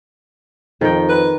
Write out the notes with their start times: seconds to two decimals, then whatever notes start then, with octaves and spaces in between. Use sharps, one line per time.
0.81 F2 D#3 G5
1.09 B4